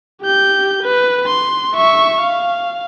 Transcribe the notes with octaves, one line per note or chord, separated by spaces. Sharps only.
G4 G6
B4
C6
E5 C#6
F5